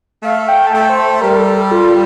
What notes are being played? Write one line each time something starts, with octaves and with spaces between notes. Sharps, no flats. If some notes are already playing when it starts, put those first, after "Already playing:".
A3 F5
F5
G5
A5
A3 G5
C5
C5
G3 A#4
A4
A4
F4